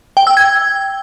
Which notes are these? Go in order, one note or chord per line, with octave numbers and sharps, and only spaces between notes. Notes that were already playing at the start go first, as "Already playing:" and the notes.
G5
E6
G#6